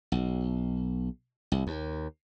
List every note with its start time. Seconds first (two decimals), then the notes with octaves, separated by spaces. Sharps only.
0.12 B1
1.52 C2
1.67 D#2